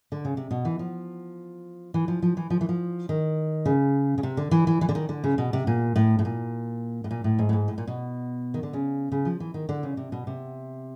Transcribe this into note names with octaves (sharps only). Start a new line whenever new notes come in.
D3
C#3
C3
B2
E3
F3
E3
F3
F3
E3
F3
E3
F3
D#3
C#3
C#3
C3
D3
E3
E3
E3
D3
D#3
D3
C#3
B2
C3
A#2
A2
A2
A#2
A2
A#2
A2
G#2
A2
G#2
A2
A#2
B2
D#3
D3
C#3
C#3
F3
E3
D#3
D3
C#3
C3
B2
C3